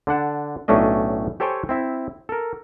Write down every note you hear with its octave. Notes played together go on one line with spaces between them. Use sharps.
D3 D4 F#5 A5
B1 A2 A3 C#4 D4 D#5
G4 A4 C5 C#5 G5 G#5
C4 E4 E5
A4 A#4